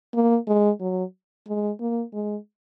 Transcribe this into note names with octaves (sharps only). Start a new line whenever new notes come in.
A#3
G#3
F#3
G#3
A#3
G#3